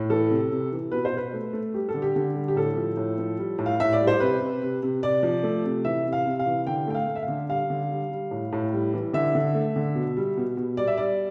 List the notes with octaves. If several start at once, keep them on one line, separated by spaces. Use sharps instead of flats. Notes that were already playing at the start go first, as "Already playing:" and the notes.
Already playing: A2
E3 A4
C3
C3
E3
B2 B4
C5
B2 B4
A3
A3
G3 G4
A4
D3
G4
D3
G3
G4
A2 A4
F3
A2
F3
G3
A2
F5
A2 E5
D5
G3
C5
C3 B4
C3
C3
C3
C3 D5
F3
A3
C3
E3 E5
C3
F5
C3
F5
E3
D3 G5
A3 G5
F5
A3
E5
F5
D3
G3 F5
D3
G3
G3
A2
A2
G3
E3
D3 E5
D3
A3
D3
B2
G3
B2
B2
G3 D5
E5
G3 D5